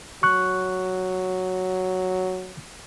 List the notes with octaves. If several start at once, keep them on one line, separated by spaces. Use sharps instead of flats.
F#3 C#6 F#6